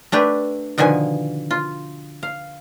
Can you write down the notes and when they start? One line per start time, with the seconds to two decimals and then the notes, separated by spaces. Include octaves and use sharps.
0.12 A3 D4 G4 B4
0.78 B2 D3 D#3 F3 G#5
1.51 F4
2.23 F5